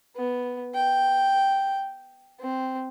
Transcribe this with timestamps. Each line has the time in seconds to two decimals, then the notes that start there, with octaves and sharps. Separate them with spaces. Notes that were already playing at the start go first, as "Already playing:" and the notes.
0.16 B3
0.74 G5
2.40 C4